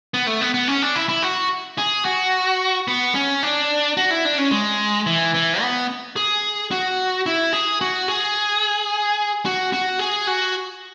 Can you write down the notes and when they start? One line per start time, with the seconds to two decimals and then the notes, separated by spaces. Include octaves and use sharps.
0.14 B3
0.27 A3
0.41 B3
0.54 B3
0.68 C#4
0.82 D4
0.96 E4
1.09 E4
1.23 F#4
1.78 G#4
2.05 F#4
2.88 B3
3.15 C#4
3.43 D4
3.97 F#4
4.11 E4
4.25 D4
4.38 C#4
4.51 G#3
5.07 E3
5.34 E3
5.61 B3
6.16 G#4
6.71 F#4
7.26 E4
7.53 G#4
7.81 F#4
8.08 G#4
9.45 F#4
9.73 F#4
9.99 G#4
10.27 F#4